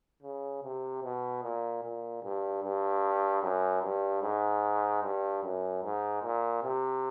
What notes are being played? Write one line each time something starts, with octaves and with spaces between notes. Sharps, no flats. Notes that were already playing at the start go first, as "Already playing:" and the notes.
C#3
C3
B2
A#2
A#2
G2
G2
F#2
G2
G#2
G2
F#2
G#2
A#2
C3